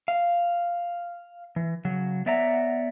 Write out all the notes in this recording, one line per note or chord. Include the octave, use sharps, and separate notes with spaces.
F5
E3
C#3 F#3
B3 C#5 D5 E5 F#5 A#5